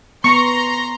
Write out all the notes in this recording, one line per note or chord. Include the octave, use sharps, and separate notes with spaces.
B3 A#5 C6 C#6